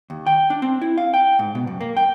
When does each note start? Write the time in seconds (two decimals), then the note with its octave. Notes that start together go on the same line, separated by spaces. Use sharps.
0.10 D#2
0.26 G5
0.50 D4
0.62 C4
0.82 E4
0.98 F5
1.14 G5
1.39 G#2
1.55 B2
1.67 F#2
1.81 A#3
1.97 G5